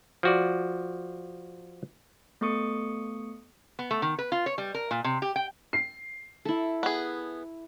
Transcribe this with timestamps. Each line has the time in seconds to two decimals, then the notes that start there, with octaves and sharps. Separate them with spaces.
0.23 F3 F#4 D5
2.41 A3 B3 A4 C#6 D#6 C#7
3.79 B3
3.91 A3
4.02 D#3
4.18 B4
4.32 F4
4.46 C#5
4.58 G3
4.74 A#4
4.91 A#2
5.04 C3
5.22 G4
5.36 G5
5.73 C7
6.45 E4 A4
6.83 B3 G#4